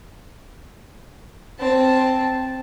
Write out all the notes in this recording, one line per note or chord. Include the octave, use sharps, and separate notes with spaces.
C4 A5